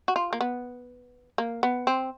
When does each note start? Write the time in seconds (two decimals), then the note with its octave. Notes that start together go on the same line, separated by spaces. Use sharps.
0.08 F#4
0.16 F4
0.33 A#3
0.41 B3
1.38 A#3
1.63 B3
1.87 C4